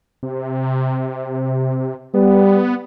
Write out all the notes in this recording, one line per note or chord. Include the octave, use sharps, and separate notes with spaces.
C3
G3 B3